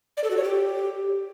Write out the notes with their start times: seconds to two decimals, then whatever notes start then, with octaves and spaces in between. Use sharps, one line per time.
0.17 D5
0.24 A4
0.31 F#4
0.37 C#5
0.44 G4